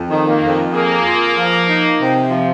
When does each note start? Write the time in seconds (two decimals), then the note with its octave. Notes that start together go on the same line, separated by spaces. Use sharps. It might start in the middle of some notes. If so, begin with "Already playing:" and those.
Already playing: F2
0.11 D#3
0.27 A#3
0.43 F2
0.73 A#3 G#4
1.05 F4
1.36 F3
1.68 D#4
2.00 C3
2.31 F3